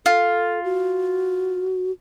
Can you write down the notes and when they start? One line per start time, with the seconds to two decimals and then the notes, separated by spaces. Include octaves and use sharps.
0.06 F4 A4
0.64 F#4